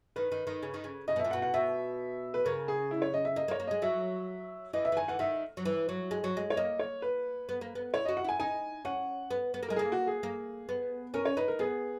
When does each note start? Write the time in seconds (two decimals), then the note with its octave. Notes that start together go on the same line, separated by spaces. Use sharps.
0.16 D#3 B4
0.32 D#3
0.47 D#3
0.63 C#3
0.74 D#3
0.84 C#3
1.08 C#3 D#5
1.16 B2
1.19 E5
1.25 A#2
1.31 B2 F#5
1.42 F#5
1.54 B2 E5
2.34 B4
2.45 C#3 A#4
2.68 G#4
2.91 E4
3.02 C#5
3.14 D#5
3.25 E5
3.36 A#3 D#5
3.48 A#3
3.51 C#5
3.60 A#3
3.67 G#3 D#5
3.82 F#3 E5
4.73 E3 D#5
4.85 E5
4.92 E3
4.97 D#3 G#5
5.08 E3 F#5
5.19 D#3 E5
5.57 F#3
5.65 E3
5.89 F#3
6.11 G#3
6.24 F#3
6.37 G#3
6.50 C#5
6.57 A#3 D#5
6.79 C#5
7.02 B4
7.49 B3
7.61 A#3
7.75 B3
7.94 E4 C#5
8.05 F#4 D#5
8.17 F#5
8.25 E4 G#5
8.40 D#4 G#5
8.85 C#4 F#5
9.31 B3
9.54 B3
9.63 A#3
9.69 G#3 A#4
9.76 A#3 G#4
9.92 F#4
10.07 G#4
10.23 A#3
10.69 B3
11.14 C#4 A#4
11.25 C#5
11.37 D#4 B4
11.48 A#4
11.59 B3 G#4